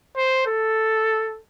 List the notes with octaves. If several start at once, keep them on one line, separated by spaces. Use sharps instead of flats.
C5
A4